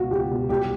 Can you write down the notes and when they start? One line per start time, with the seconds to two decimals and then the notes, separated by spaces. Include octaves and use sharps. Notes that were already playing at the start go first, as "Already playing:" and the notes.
Already playing: C#2 B2 F4 F#4
0.11 C#2 G4
0.30 B2
0.49 C2 G4